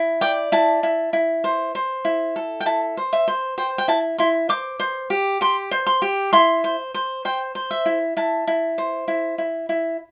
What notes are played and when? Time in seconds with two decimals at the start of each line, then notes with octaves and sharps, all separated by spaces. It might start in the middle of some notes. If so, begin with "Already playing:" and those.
Already playing: E4
0.21 D5 G5
0.52 E4 A5
0.83 E4
1.13 E4
1.44 C5
1.75 C5
2.05 E4
2.36 A4
2.60 G5
2.66 E4 A5
2.97 C5
3.13 E5
3.28 C5
3.58 C5 G5
3.78 G5
3.88 E4 A5
4.18 E4 C6
4.49 C5 D6
4.80 C5
5.10 G4
5.41 G4 C6
5.71 C5
5.87 C6
6.02 G4
6.33 E4 C6
6.64 C5
6.94 C5
7.25 C5 G5
7.55 C5
7.71 E5
7.86 E4
8.17 E4 A5
8.47 E4
8.78 C5
9.08 E4
9.38 E4
9.69 E4